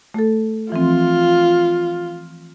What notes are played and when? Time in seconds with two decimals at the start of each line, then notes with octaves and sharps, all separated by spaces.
0.14 A3 A4
0.72 E3 F3 C4 F4